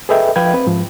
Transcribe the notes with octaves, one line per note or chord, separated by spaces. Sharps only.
G#4 A4 B4 D#5 E5 G5
F3 B4 F5 G5 G#6
C4 B4
G#2 F3